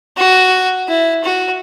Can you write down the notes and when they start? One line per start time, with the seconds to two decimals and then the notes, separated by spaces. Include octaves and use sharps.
0.17 F#4
0.88 E4
1.24 F#4